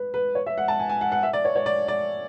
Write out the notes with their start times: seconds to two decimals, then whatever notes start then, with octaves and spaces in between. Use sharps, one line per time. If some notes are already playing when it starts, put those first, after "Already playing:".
Already playing: B4
0.14 B4
0.35 C#5
0.46 E5
0.58 F#5
0.68 A5
0.79 G#5
0.89 G#5
1.01 F#5
1.12 F#5
1.23 E5
1.33 D5
1.45 C#5
1.56 C#5
1.66 D5
1.88 D5